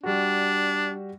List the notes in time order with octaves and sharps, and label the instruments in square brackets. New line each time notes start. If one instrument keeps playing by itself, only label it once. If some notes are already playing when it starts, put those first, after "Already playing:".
[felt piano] G3 F#4 [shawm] D4